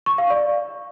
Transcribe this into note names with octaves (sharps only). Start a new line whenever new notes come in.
C#6
F5
D5